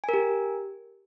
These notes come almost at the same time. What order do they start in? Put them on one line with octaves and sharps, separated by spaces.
G#5 A#4 G4